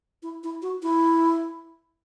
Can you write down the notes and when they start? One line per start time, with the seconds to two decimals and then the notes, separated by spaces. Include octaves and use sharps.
0.23 E4
0.43 E4
0.62 F#4
0.83 E4